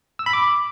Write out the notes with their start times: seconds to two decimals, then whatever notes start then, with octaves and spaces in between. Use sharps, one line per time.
0.19 E6
0.26 B5
0.33 D6